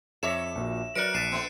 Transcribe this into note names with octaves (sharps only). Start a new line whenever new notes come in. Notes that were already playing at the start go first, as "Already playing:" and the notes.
F2 A4 C#5 E5 D6 A#6 E7
A#1 A#2 F#4
F#3 A#4 B4 D5 F#6 C#7 D7
A#1 A6 B6 C7 D#7 E7
A3 B3